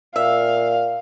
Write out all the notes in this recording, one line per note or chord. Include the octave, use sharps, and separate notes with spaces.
A#2 E5 F5